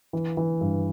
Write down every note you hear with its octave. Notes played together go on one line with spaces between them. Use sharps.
E3
E3
G2